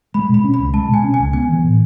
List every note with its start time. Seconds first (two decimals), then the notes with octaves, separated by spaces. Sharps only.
0.14 G#3 B5
0.29 B2
0.34 B5
0.44 C#4
0.54 C#2 B5
0.74 G#3 A5
0.89 B2 G#5
1.04 C#4
1.14 C#2 G#5
1.33 B3 G#5
1.49 E3
1.64 A2